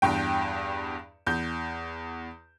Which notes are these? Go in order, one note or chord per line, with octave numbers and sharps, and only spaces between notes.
E2 G2 G5
E2 G6